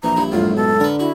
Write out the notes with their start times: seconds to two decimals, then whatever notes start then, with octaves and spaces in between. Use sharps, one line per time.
0.03 A#1 E3 A#5
0.16 G2 E4
0.32 C#2 F#2 A2 F4
0.56 B2 A4
0.80 D3 A#4 B4
0.99 E4 F#4